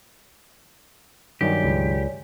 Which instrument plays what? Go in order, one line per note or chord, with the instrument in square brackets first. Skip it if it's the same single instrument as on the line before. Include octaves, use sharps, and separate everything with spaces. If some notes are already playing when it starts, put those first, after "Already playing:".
[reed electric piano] G2 D#3 F#3 [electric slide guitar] G4 [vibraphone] C#5 D5 G#5
[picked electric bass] C#2